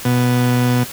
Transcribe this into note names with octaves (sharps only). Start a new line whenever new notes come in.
B2